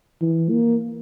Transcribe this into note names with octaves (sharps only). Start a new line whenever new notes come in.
E3
A#3